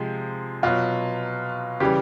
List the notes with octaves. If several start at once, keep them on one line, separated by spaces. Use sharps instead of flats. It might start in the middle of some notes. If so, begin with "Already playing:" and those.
Already playing: C3 F3 G#3
B2 F#3 F4
C#3 E3 G3 G4